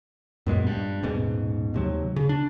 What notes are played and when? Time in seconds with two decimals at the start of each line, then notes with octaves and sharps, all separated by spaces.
0.47 F#2 A#2 G#3 B3
0.67 G2
1.03 D#1 G#2 B2
1.74 D#2 C3 F#3
2.16 C#3
2.29 D4